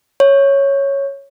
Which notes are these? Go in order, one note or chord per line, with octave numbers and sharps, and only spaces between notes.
C#5